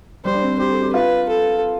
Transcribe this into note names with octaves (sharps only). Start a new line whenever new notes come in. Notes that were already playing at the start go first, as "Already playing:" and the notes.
G3 C5
D4
C4
G4 C5
A4
G4
F4 B4
A4